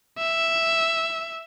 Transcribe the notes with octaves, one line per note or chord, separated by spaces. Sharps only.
E5